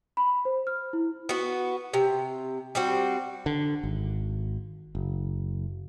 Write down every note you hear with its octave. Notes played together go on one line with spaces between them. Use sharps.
B5
C5
F6
E4
B3 F#4
C3
G3 C4 F#4
D3
G#1
F#1